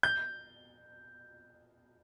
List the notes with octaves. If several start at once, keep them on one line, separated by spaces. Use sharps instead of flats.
G6